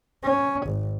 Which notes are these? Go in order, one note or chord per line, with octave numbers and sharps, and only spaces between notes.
C#4
G#1